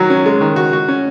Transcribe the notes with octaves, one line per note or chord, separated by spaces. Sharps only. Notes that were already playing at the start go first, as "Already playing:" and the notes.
Already playing: D#3 F#3 F#4
C#4
G#3
D#3
F#4
F#4
C#4